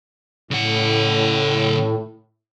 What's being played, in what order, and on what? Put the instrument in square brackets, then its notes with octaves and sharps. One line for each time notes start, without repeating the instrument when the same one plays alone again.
[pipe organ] A2 [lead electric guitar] C#3 F#5